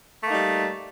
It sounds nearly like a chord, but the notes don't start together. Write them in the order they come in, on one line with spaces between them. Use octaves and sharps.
A3 A#3 D#4 G3